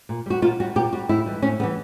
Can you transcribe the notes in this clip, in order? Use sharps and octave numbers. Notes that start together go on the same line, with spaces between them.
A#2
G3 F#4
A#2 F4
G3 F#4
A#2 G4
G3 F#4
A2 E4
E3 G3
A2 C#4
E3 G3 B3